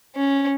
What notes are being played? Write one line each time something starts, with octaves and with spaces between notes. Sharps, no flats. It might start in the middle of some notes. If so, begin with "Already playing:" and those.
C#4